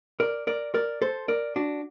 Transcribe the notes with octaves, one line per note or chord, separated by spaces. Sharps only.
A#4 D5
A#4 D5
A#4 D5
A4 C5
A#4 D5
D4 F#4